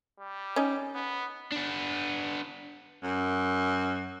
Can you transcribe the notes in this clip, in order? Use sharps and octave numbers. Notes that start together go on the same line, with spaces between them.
G3
C#4 D#4
B3
B3 D4
F#2